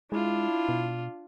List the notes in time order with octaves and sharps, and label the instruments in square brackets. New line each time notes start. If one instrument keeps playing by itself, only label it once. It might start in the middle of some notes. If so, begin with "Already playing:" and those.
[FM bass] G#3 [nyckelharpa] D4 F4 [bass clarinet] E4
[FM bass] B2